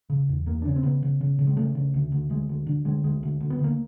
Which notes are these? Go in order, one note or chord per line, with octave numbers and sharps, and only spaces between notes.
C#3
E2
E2 A#3
D4
C#3 C#4
C4
C#3 B3
C#3
C#3
C#3
G#3
C#3 A3
C#3
D2
D2
D2 G#3
D2
D3
D3 G#3
D2 G#3
D2
D2
B3
D3
A#3